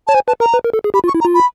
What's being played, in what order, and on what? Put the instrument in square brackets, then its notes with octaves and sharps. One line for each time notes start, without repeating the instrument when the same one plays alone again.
[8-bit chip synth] C#5 [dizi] A5
[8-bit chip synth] C5 [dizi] G#5
[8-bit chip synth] B4 [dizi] A5
[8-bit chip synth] A#4 [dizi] A#5
[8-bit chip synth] B4
A#4
A4
G#4
[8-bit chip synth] G4 [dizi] B5
[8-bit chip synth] F4
[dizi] C#6
[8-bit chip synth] E4
[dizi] A#5
[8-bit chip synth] F4
[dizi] B5